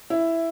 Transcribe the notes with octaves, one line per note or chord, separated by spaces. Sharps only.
E4